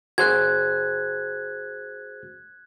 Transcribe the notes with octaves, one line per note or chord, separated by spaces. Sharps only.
F#4 G#4 C5 F#6 G#6